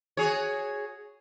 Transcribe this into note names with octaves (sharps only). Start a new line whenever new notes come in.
F#4 G#4 C#5